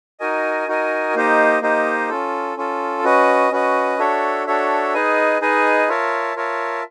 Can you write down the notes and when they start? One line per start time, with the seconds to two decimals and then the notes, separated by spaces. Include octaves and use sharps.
0.20 D#4 F#4 A#4 D#5 G#5
0.68 D#4 F#4 A#4 D#5 G#5
1.15 A#3 D#4 G4 C5 D#5
1.62 A#3 D#4 G4 C5 D#5
2.09 C#4 F4 A4
2.57 C#4 F4 A4
3.04 C#4 F#4 B4 D#5
3.51 C#4 F#4 B4 D#5
3.99 D4 F#4 A4 C#5 E5
4.47 D4 F#4 A4 C#5 E5
4.94 D#4 G#4 B4 D#5 G#5
5.41 D#4 G#4 B4 D#5 G#5
5.88 F4 A#4 C#5 E5 A5
6.36 F4 A#4 C#5 E5 A5